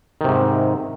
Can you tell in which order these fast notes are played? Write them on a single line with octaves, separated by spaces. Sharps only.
D#3 C3 G#2